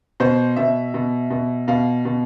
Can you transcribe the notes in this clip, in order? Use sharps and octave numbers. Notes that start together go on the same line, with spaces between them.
B2 C5
B2 E5
B2
B2
B2 F5
B2